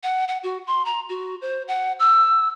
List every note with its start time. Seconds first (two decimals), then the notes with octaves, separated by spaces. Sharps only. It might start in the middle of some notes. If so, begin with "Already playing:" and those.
0.03 F#5
0.28 F#5
0.43 F#4
0.67 C6
0.85 A#5
1.09 F#4
1.42 C5
1.68 F#5
1.99 E6